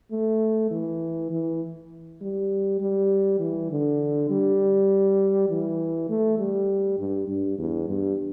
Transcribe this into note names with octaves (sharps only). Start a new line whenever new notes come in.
A3
E3
E3
G3
G3
E3
D3
G3
E3
A3
G3
G2
G2
E2
G2